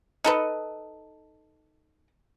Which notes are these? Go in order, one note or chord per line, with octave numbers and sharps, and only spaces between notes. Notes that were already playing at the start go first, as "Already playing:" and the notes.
D#4 A4 B4